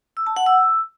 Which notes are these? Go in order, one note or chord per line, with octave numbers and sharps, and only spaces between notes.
E6
A5
F#5
E6